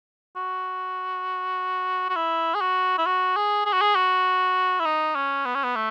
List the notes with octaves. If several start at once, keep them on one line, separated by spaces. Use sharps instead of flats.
F#4
F#4
E4
G#4
F#4
E4
F#4
G#4
G#4
F#4
G#4
F#4
E4
D#4
C#4
B3
C#4
B3
A3